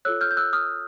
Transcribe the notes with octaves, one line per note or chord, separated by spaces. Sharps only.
F4 A4 C#5 E6 F#6
F6 G6
G6
E6 F#6
D#6 F6